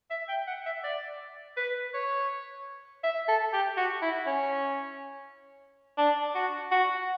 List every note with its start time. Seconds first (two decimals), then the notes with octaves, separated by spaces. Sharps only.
0.10 E5
0.29 G5
0.47 F#5
0.66 E5
0.84 D5
1.57 B4
1.94 C#5
3.04 E5
3.28 A4
3.53 G4
3.77 F#4
4.02 E4
4.26 C#4
5.98 D4
6.35 F#4
6.71 F#4